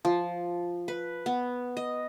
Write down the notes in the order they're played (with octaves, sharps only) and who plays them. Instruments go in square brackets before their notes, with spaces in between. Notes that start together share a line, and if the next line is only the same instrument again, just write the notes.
[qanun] F3
B4
B3
D#5